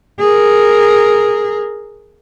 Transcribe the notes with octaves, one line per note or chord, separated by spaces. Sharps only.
G#4 A#4